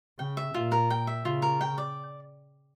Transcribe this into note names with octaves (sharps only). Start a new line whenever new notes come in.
C#3 G5
E5
A#2 F4
A#4
G5
E5
C#3 F4
A#4
G5
D5